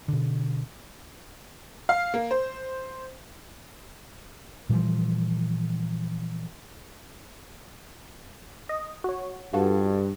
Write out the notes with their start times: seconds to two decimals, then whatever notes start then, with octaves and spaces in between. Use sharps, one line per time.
0.08 B2 D3
1.89 F5
2.14 A#3
2.31 C5
4.69 A#2 E3 F3 G3
8.69 D#5
9.04 F#4 C#5
9.53 G2 F4 F#4 A4